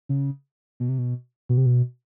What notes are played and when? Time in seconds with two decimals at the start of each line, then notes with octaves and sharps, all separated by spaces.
0.09 C#3
0.80 B2
0.89 C3
0.98 B2
1.49 B2
1.57 C3
1.66 B2